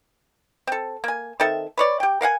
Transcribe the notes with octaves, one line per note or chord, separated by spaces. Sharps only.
C4 A4
A#3 G#5
D#3 C4 A4 E5
B4 C#5 D5
G4 G5
A#4 F5 F#5 G#5